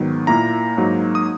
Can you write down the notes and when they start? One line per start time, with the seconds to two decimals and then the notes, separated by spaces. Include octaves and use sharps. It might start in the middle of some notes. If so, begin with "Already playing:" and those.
Already playing: G#2 D#3 F#3 B3
0.27 A#2 A#3 E4 A#5
0.77 G#2 F#3 A#3 D#4
1.15 D#6